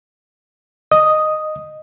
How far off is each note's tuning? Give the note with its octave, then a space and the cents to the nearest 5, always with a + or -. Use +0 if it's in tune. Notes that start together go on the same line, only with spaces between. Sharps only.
D#5 -15 D#6 +0